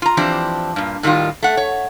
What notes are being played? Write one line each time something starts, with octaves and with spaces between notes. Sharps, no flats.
F4 A#5
E3 F3 C4 D4 G4
G2 A#2
A2 D#3 G3 F4
A3 F#5
C#5